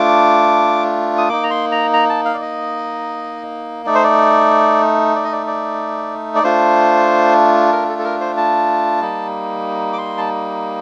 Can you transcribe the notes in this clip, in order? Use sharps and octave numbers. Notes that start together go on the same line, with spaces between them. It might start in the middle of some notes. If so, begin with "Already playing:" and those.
Already playing: A3 D4 F4 D6
D#6
A#3 D#4 D6
A#5
C6
A#5
A#5
A5
F5
D5
D#5
A3 D#4 D5
C5
D5
D5
D#5
D5
D5
D5
A3 D4 F4 C5
A#4
A4
A4
A#4
C5
A5
G3 A#3 D#4
D6
C6
A5